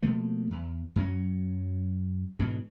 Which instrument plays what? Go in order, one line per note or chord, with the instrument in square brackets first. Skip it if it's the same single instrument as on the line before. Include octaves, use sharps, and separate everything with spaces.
[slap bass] B2 F3 A3 A#3
E2
F#2 F#3 G3 C#4
G#2 B2 D3 E3